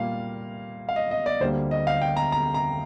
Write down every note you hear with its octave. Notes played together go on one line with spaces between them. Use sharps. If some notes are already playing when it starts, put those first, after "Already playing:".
Already playing: A#2 G3 A#3 F5
F5
D#5
D#5
D5
D2 D3 G3 A#3 C5
D#5
F5
G5
A#5
A#5
A#5